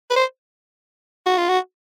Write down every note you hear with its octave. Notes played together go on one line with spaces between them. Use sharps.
B4
C5
F#4
F4
F#4